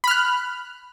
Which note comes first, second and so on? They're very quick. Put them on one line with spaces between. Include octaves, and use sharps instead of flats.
B5 F6 F#6